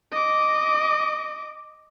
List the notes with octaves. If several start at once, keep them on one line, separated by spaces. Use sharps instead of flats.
D#5 D6